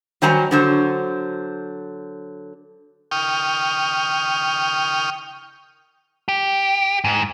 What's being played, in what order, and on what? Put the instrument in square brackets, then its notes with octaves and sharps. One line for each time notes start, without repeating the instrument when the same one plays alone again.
[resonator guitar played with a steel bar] D#3 F#3 G3 C5 G#5 A#5
D3 F#3 C5
[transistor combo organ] G5 C#6 D#6 F6
[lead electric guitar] G4
G#2